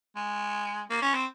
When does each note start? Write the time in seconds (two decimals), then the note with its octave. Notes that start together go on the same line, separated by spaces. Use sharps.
0.16 G#3
0.90 A#3
1.02 C#4
1.14 C4